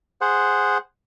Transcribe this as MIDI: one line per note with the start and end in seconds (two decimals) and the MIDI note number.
0.21 0.78 68
0.21 0.78 72
0.21 0.78 78